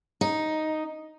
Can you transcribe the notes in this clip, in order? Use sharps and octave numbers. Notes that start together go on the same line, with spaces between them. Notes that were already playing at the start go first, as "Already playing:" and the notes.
D#4